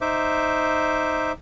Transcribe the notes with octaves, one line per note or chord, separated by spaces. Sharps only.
D#4 C5 E5 D6